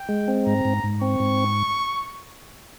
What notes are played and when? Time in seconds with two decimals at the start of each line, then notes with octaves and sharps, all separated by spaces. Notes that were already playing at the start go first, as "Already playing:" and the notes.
Already playing: G5
0.09 G#3
0.28 C4
0.46 G#2 A#5
0.65 G#2
0.84 G#2
1.01 C4 C#6
1.20 G#2